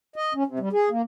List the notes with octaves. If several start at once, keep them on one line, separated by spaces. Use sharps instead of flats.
D#5
C#4
C3
G3
G#4
A#3